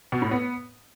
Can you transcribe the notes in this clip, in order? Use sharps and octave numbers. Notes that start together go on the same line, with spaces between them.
B2
A2
B3